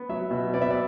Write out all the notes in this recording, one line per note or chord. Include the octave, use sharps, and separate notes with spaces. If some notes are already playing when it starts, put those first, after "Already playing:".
Already playing: B3
F#3 E5
B2
B3 D5
E5
D5